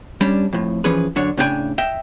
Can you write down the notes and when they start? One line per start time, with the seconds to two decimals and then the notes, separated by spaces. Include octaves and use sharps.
0.21 G3 C#4 D4
0.53 F2 A2
0.84 E3 F3 C#4 G#4 B4
1.16 F#2 D3 D4 C#5
1.37 A2 C#3 D4 E4 G5 G#5
1.78 D#5 E5 G5